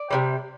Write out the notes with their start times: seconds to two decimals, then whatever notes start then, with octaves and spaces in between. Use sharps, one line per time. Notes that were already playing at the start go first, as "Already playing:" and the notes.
Already playing: D5
0.11 C3 E3 G3